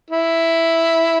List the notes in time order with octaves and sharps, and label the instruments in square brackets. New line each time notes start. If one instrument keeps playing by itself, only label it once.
[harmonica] E4